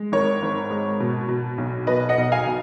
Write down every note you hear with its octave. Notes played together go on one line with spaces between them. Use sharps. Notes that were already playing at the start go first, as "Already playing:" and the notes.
Already playing: G#3
G#1 A#4 C#5
G#1
G#3
B2
B2
B1
B2 B4 D#5
D#5 F#5
B1
F5 G#5
B2